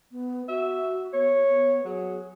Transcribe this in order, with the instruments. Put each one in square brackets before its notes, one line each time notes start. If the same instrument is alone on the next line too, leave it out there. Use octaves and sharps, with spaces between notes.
[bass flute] B3
[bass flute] F#4 [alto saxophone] E5
[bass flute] B3 [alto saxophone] C#5
[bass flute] B3
[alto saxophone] F#3 [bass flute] G#4